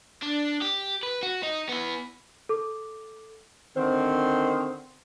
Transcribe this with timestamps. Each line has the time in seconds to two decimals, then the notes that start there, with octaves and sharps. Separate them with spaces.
0.23 D4
0.62 G4
1.03 B4
1.23 F#4
1.43 D#4
1.69 B3 E4
2.49 A4 D6
3.76 D3 D#3 C4 C5